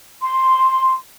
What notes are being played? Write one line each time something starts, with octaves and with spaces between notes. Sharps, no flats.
C6